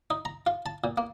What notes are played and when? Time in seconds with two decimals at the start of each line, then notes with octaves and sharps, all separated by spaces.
0.10 D#4
0.25 A#5
0.47 F4
0.66 A5
0.84 A#2
0.98 A#3